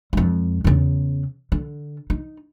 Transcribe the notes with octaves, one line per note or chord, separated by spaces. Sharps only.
F2 G#3
E2 C#3
D3
D#4